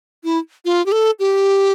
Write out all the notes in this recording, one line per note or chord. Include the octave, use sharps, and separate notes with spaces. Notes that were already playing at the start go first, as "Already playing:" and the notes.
E4
F4
G4
A4
G4